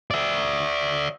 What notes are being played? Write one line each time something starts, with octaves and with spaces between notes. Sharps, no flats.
D5 E5